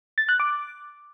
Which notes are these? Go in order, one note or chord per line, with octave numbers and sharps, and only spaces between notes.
A6
F#6
D6